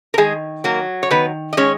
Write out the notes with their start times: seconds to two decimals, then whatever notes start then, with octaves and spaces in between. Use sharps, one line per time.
0.14 A#4
0.18 D#3 G#3 G#4
0.64 F#3 A#3 A#4
1.03 C#5
1.11 D#3 B3 B4
1.53 D#5
1.57 G#3 C#4 C#5